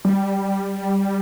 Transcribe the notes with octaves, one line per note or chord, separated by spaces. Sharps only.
G3